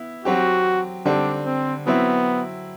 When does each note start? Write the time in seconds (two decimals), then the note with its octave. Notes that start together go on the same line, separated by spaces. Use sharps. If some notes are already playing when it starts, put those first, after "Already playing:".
Already playing: B3 E4
0.25 F#3 C4 F#4 G4
1.05 D3 G3 C4 D4
1.46 C4
1.87 F#3 B3 C4 E4